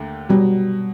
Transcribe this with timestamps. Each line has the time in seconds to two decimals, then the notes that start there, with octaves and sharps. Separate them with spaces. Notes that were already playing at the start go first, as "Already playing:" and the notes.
Already playing: D#2 D3 A3
0.29 B2 F#3 G3